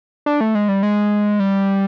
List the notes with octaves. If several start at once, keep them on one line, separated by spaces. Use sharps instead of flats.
D4
A3
G#3
G3
G#3
G3